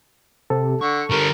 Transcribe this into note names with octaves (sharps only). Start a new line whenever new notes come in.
C3 A4
D3 C#6
D3 G3 A#4